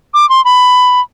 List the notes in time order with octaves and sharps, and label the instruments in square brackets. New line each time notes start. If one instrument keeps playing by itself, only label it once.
[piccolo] D6
C6
B5